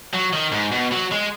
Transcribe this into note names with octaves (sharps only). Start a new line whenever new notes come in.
F#3
D#3
G#2
B2
F#3
G#3